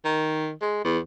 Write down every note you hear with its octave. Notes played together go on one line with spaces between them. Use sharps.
D#3
G#3
E2